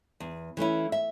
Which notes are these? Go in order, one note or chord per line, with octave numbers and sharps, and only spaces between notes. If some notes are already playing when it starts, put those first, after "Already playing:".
E2
E3 A3 C#4 E4
E5